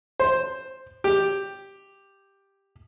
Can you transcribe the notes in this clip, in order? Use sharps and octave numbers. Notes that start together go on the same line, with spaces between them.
C5
G4